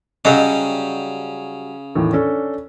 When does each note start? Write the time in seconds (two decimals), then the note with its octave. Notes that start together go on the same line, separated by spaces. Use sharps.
0.25 C#3 F#3 G3 C#4 D#5
1.95 E2 A2 D#3
2.13 C#4 D4 A4